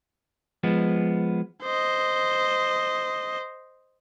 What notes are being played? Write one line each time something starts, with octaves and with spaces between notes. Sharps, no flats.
F3 G#3 B3
C5 D#5